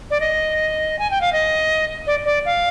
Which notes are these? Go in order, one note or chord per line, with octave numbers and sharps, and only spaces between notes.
D5
D#5
G#5
G5
F5
D#5
D5
D5
F5